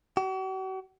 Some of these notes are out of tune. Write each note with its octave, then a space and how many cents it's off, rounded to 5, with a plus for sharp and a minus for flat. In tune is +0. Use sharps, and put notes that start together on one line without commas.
F#4 +45